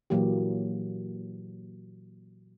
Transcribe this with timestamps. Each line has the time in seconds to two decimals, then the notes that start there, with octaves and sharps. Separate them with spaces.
0.10 A#2 E3 F#3 A#3 G4